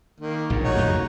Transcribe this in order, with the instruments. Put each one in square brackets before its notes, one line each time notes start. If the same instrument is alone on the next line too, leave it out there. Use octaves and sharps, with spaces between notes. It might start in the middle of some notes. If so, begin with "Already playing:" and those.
[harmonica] D#3 A#3
[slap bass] A#1 G#2
[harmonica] D#4 F#4 C#5
[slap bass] F2 C#3 A3